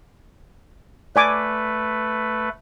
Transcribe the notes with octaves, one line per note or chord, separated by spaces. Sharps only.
A3 B4 D5 G#5 D6